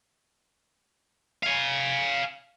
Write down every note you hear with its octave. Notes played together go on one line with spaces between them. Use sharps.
F5 G#5